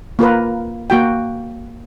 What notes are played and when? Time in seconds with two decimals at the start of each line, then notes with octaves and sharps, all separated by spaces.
0.19 A#3 F4 A#4 B4
0.90 A#3 F#4 G5